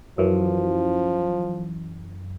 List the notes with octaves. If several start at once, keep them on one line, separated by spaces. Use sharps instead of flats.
F#2 E3 F3